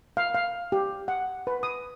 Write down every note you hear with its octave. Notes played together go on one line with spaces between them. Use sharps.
F5
F5
G4
F#5
B4
D#6